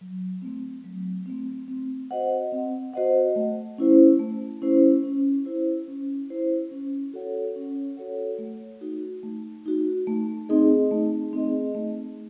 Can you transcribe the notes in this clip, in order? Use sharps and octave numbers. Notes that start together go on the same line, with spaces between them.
F#3
A3 C4
F#3
A3 C4
C4
F#4 C5 D#5 F#5
C4
F#4 C5 D#5 F#5
A3
C#4 E4 C5
A3
C#4 E4 C5
C#4
E4 C5
C#4
E4 C5
C#4
F#4 A4 C#5 F#5
C#4
F#4 A4 C#5 F#5
A3
D#4 F#4
A3
D#4 F#4
A3
C4 D#4 G#4 D#5
A3
C4 D#4 G#4 D#5
A3